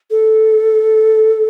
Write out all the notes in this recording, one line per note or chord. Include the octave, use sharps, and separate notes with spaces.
A4